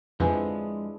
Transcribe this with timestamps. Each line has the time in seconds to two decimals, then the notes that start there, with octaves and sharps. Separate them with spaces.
0.20 F2 D3 F3 G#3 D4 E4 B4 G#5